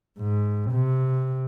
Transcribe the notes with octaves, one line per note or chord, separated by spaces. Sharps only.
G#2
C3